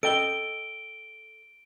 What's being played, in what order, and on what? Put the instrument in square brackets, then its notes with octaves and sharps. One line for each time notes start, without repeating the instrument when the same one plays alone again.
[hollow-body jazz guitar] A4 D#5 G5 [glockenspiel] D7 G7